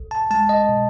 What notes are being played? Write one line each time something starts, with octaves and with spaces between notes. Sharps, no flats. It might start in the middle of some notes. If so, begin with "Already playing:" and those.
Already playing: B1
A5
G#3 A5
D#5
B2